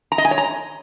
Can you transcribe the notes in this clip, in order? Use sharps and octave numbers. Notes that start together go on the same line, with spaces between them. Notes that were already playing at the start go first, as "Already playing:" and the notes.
A#5
D#5
G#5
C#5
A#5